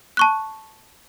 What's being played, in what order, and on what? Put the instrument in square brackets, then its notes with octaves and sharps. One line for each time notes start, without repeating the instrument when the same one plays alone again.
[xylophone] A5 C#6 F#6